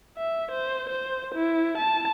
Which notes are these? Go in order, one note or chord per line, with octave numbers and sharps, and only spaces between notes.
E5
C5
C5
E4
A5